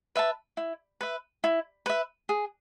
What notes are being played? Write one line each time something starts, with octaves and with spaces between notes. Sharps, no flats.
B4 E5 A5
E4
B4 E5
E4
B4 E5
G#4